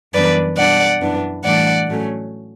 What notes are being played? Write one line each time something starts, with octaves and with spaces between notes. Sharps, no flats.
F#2 E3 G3 B3 D4 B4 D5
B2 G3 D4 D5 F#5
F#2 E3 B3 D4
A2 E3 G3 D4 D5 F#5
A2 F#3 A3 C#4